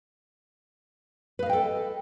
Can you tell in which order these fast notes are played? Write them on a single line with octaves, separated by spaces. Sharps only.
B4 F5 D#5 G5 A4